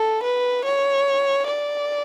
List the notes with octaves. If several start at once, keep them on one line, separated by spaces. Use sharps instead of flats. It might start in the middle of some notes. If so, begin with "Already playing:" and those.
Already playing: A4
B4
C#5
D5